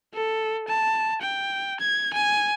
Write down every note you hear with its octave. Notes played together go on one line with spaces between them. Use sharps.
A4
A5
G5
G#6
G#5